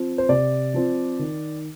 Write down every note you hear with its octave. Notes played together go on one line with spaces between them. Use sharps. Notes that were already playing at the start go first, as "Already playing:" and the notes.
Already playing: F3 C4
C5
C3 D5
F3 C4
D#3